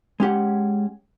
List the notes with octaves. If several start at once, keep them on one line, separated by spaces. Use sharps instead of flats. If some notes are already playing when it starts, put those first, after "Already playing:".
G#3 C#4 G4 F#5